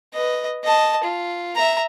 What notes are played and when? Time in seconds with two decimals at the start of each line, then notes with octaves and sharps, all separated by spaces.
0.14 B4 D#5
0.64 D#5 A5
1.03 F4
1.56 E5 A#5